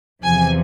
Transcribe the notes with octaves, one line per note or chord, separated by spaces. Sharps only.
E2 C3 F3 G#5